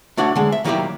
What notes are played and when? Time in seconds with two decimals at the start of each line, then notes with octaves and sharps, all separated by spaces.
0.17 A3 D4 F#4 C#5 D5 F#5
0.36 D3 G#3
0.52 E5
0.64 D#3 F#3 A#3 E4 G4 D5